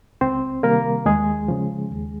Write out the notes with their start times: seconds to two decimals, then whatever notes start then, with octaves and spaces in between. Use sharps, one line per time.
0.21 C#2 C4 C5
0.63 C3 D#3 G3 A#3 A#4
1.06 D#2 G#3 G#4
1.48 C#3 F3
1.90 D#2